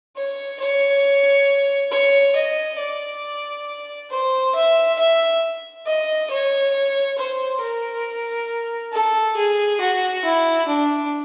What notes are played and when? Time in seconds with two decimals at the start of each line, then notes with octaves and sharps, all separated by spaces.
0.16 C#5
0.60 C#5
1.91 C#5
2.36 D#5
2.79 D5
4.10 C5
4.55 E5
4.98 E5
5.86 D#5
6.30 C#5
7.18 C5
7.61 A#4
8.93 A4
9.36 G#4
9.80 F#4
10.24 E4
10.68 D4